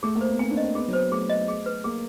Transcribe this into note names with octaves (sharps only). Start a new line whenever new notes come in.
A3 G#4
A#3
C5
B3
C4 G#5
D4
D#5
C4
B3 G#4
F#3
C5
A3 G#4
D#5
G#4
B4
A#3 G#4